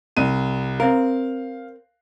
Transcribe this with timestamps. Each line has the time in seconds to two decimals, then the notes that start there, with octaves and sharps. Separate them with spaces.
0.17 C2 D#7
0.80 C4 A#4 F5